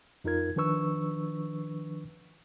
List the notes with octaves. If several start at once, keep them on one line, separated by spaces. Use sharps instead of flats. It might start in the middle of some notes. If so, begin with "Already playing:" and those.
F2 D#4 F4 A#4 G#6
D#3 F3 D4 B4 C#6 E6